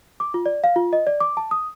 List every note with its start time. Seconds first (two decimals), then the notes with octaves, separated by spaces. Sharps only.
0.20 D6
0.34 F4
0.46 D5
0.64 F5
0.76 F4
0.93 D#5
1.07 D5
1.20 D6
1.37 A5
1.51 D#6